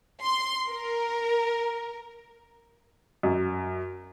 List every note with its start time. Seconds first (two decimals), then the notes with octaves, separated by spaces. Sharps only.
0.23 C6
0.68 A#4
3.23 F#2